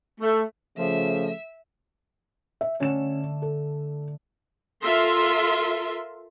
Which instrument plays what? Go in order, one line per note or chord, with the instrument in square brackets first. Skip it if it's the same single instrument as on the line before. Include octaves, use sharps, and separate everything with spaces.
[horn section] A3
[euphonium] C#3 [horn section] F3 [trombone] A3 [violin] E5
[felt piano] E5
[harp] D3 A3 [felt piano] C#4 E7
[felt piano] A4
[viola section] F4 A4 A#4 E5 C6